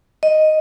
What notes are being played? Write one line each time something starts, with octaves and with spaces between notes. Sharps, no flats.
D#5